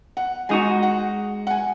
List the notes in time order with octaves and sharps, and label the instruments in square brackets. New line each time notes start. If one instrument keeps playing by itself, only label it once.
[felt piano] F#5
[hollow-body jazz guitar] G#3 D#4 F#4 [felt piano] G#5
[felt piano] F#5
F#5
G#5